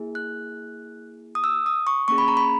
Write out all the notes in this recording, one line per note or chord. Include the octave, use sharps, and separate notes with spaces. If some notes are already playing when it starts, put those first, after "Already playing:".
Already playing: A#3 E4 G#4
F#6
D#6
E6
D#6
C#6
A#3 C#4 G#4 C#6
B5
A#5
B5